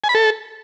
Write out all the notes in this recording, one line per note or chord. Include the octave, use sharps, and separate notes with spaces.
G#5
B5
A4